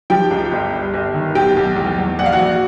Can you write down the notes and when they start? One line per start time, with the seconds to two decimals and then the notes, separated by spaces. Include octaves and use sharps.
0.10 F3 G4 G5
0.31 C#2
0.52 G1
0.73 G3
0.94 G1
1.14 D#3
1.35 B1 G4 G5
1.57 B1
1.76 E2
1.98 E2
2.19 A#1 F#5
2.26 F5
2.33 F#4 F#5
2.39 A#1